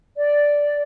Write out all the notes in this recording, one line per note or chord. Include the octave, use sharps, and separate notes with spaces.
D5